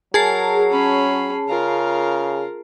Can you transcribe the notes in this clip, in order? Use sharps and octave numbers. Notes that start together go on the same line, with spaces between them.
F#3 G#4 A#4 A5 C7
C#4 B5
C#3 F4 A#4